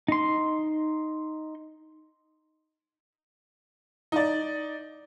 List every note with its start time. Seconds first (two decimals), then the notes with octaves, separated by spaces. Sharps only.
0.08 D#4 C6
4.12 D#4 D5